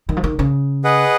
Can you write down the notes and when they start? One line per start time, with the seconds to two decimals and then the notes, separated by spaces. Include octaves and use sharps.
0.09 D#3
0.17 F3
0.24 D#3
0.39 C#3
0.84 G#4 B4 D#5 F#5